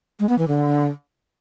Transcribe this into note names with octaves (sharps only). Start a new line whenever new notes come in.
G#3
B3
E3
D3